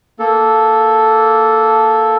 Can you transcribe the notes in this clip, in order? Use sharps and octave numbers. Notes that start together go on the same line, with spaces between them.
A#3 A4